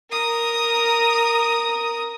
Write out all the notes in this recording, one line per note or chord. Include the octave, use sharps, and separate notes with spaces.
A#4 D#6